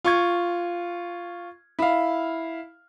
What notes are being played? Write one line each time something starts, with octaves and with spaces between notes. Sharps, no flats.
F4 C#6 G#6
E4 F5